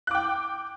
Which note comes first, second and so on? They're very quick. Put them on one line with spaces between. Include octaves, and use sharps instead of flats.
F#6 D6 G5